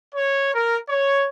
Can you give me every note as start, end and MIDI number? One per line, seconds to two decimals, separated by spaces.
0.15 0.51 73
0.54 0.77 70
0.89 1.29 73